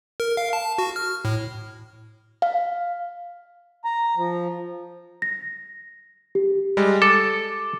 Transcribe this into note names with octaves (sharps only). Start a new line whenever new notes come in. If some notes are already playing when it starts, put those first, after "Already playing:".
A#4
F5
A5
F#4
F6
A2
F5
A#5
F3
A#6
G4
G3 G#3
A4 D6